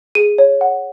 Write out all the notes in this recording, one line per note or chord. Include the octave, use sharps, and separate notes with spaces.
G#4 D#7
C#5
F#5